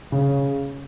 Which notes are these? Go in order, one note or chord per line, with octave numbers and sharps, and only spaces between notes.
C#3